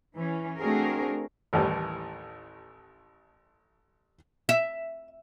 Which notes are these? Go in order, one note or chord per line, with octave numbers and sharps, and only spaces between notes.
E3 C#4
A3 C4 D4 F#4 G#4 A#4
A1 D#2 A2 E3 G3
E5